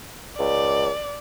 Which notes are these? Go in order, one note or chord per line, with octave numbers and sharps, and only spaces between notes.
C#2 D5